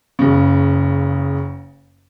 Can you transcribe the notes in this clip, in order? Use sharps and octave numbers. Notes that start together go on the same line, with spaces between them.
F#1 C#3